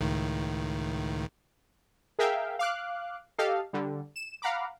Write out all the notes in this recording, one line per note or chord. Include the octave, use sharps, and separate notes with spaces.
C#2 A2 D#3
G#4 A#4 E5 F5 G5
F5 D6 F#6
G4 A4 D#5 F5
D3 G3
E7
F5 F#5 A#5 B5 D6